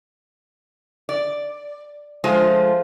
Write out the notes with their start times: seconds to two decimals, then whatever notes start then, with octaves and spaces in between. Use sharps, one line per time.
1.09 D5
2.24 F3 G#3 A3 F4